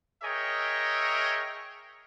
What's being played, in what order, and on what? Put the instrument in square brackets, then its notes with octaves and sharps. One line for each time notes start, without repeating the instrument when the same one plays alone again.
[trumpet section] G#4 A#4 C#5 D#5 E5 G5